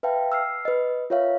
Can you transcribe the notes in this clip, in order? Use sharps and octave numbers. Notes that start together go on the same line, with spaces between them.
B4 E5 F5 G5 A5
E6 F6 C7
B4 D#5
F4 A#4 C#5 E5 F5